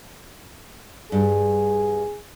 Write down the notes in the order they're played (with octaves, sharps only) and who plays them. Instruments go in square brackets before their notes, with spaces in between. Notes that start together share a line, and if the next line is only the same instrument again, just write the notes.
[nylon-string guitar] G2 G3 [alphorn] G#4